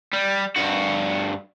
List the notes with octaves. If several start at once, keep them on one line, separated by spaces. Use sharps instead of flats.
G3
G2 F#4